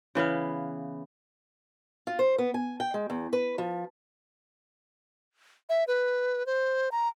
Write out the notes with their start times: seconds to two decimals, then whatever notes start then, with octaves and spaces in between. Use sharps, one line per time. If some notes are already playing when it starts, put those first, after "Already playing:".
0.15 C#3 E3 B3 F5
2.07 F4
2.19 C5
2.38 B3
2.54 G#5
2.80 G5
2.94 G#3
3.10 E2
3.33 B4
3.58 F3
5.69 E5
5.87 B4
6.46 C5
6.92 A#5